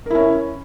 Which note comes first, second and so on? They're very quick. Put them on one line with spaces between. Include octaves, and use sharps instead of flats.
A#4 E4 C#4